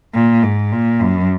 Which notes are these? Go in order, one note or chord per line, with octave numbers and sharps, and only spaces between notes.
A#2
G#2
A#2
F#2